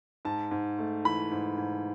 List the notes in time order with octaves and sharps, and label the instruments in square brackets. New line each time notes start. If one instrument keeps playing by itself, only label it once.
[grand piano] G#2 A5
G#2
A3
E3 B5
G#2
G#2